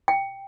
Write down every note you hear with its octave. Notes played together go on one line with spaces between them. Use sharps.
G5